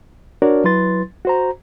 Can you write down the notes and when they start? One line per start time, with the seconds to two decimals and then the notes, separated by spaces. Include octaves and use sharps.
0.42 D4 F#4 A#4 C#5 D5
0.64 F#3 E4 B4 C6 A6
1.25 F#4 C5 A#5